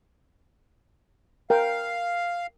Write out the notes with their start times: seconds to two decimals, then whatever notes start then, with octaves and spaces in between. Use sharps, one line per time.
1.50 A#4 F5 G5